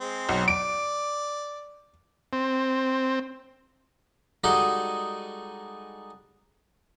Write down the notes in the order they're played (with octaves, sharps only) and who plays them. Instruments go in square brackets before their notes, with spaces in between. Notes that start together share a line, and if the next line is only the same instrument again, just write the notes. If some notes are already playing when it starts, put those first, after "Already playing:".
[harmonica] G#3 C4
[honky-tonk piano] B1
[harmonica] D5 [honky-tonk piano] D7
[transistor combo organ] C4
[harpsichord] G3 G#3 D#4 F#4 G#4 A4